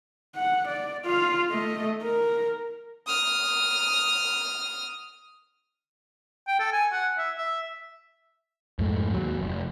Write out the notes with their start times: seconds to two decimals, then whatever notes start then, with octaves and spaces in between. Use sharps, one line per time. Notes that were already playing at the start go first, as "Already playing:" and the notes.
0.35 F#5
0.68 D5
1.05 F4 F5
1.50 A3 D#5
2.03 A#4
3.07 D#6 F6
6.47 G5
6.59 A4
6.73 G#5
6.92 F#5
7.18 E5
7.37 E5
8.79 F2 G#2 A3
9.14 D#2 F#3
9.39 F1